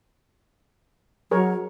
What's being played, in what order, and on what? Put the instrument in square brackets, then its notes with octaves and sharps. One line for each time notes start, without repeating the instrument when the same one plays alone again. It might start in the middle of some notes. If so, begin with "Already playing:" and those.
[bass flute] F#3 [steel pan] G#4 A#4 C#5